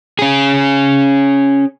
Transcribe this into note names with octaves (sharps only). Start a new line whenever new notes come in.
C#4 G#4